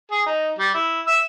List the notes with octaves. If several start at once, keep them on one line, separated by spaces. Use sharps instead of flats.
G#4
D#4
G3
E4
E5